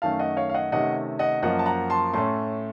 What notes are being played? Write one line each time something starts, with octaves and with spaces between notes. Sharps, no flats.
F#2 D#3 A3 C#4 F5 A5
D#5 F#5
C#5 F5
F5
D#5 F#5
C3 D#3 A3 C#4 D#5 F#5
D#5 F#5
F#2 F3 A#3 D#5 F#5
A5
F#5 A#5
A5 C6
A2 A3 C#4 A5 C6